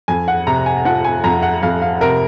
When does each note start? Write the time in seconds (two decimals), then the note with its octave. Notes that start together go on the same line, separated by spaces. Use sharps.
0.08 F2 G#5
0.28 F#5
0.47 C3 A#5
0.66 G#5
0.85 F3 F#5
1.04 G#5
1.24 F2 A#5
1.43 F#5
1.63 F2 F5
1.82 F5
2.01 C3 A#4